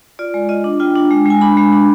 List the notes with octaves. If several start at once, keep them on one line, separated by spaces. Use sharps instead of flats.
F4 D5
G#3
F4 D#5
D4
F4 G5
D4
G#3
G#3 G#5
D4 B5
G#3
D4